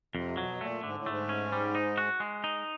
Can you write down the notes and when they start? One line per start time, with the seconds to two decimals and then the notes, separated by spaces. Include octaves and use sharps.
0.15 F2 C3
0.37 B2 F#3
0.60 A#2 A3
0.83 G#2 D3
0.96 A2
1.06 G#2 A3
1.29 C#4
1.52 G3
1.75 D#4
1.98 F#4
2.20 G#3
2.44 D#4